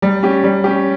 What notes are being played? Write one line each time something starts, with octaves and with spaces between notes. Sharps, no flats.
G3
C#4 G4
G3
C#4 G4